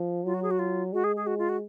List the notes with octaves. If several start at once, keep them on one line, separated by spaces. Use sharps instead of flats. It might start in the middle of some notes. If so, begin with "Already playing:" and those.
Already playing: F3
F#3 F4
F#4
G#4
F#4
F4
G#3 F#4
G#4
G#4
F#4
F4
F#4